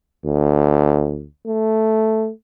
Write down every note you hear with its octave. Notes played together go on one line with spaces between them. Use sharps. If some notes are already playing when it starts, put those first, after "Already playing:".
D2
A3